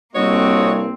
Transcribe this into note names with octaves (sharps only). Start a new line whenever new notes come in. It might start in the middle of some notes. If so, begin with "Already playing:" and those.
C2 G2 A#3 C4 F#4 C#5 D#5